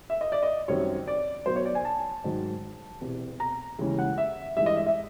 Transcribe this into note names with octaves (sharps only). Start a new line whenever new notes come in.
E5
D#5
D5
D#5
F#2 D#3 G3 C4 C#5
D5
B1 B2 F#3 C5
C#5
D5
G#5
A5
G#2 D#3 F#3
E1 E2 C3
A#5
D#2 C#3 E3 G#3 C#4
F#5
E5
G2 E3 G#3 E5
D#5
E5
E5